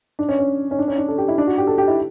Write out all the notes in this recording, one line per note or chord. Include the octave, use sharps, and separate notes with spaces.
D4
C#4
C#4
C#4
D4
C#4
D4
A4
G4
E4
D4
F#4
G4
A4
G4
E4